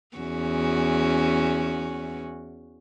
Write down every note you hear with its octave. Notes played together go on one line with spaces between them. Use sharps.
E2 C#4 F#4